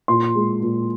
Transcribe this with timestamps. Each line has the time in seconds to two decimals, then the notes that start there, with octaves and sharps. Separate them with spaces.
0.08 A#2 C6
0.35 G#3
0.63 A#2